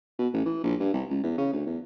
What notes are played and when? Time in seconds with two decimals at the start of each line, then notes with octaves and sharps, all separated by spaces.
0.19 B2
0.34 A1
0.46 E3
0.64 A#1
0.80 G2
0.94 C2
1.10 C#2
1.24 E2
1.38 C#3
1.53 D2
1.66 E2